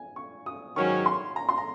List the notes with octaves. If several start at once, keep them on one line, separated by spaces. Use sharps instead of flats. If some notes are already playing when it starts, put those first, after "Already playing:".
Already playing: G#5
C#6
D#6
G#2 D#3 F#3 C#4 C#6
C6
A#5
C6
A#5